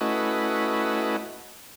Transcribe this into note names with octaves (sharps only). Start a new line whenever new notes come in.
A3 C#4 E4 F#4 B4 D#5